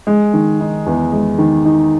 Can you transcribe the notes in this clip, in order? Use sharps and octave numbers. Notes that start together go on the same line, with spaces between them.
G#3
D#3
D#4
E2
G#3
D#3
D#4